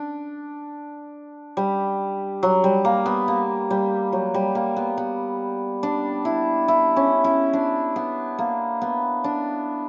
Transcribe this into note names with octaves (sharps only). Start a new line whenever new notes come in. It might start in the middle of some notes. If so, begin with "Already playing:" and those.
Already playing: D4
G3
F#3
G3
A#3
B3
A#3
G3
F#3
G3
A#3
B3
B3
D4
E4
E4
C#4
E4
D4
B3
A#3
B3
D4